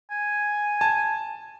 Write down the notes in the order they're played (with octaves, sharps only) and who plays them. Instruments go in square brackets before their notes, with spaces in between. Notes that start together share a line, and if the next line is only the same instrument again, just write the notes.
[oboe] G#5
[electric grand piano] A5